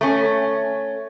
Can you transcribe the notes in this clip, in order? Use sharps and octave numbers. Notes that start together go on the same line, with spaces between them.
A3 C#4